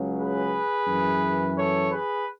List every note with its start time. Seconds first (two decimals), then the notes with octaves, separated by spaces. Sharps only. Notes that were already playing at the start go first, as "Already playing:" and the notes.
Already playing: C#2 C#3 F#3
0.19 G#4 B4
0.88 F#2 E3
1.56 A4 C#5
1.90 G#4 B4